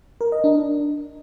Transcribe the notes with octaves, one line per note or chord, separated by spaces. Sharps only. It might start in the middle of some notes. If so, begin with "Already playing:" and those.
A#4
D#5
D4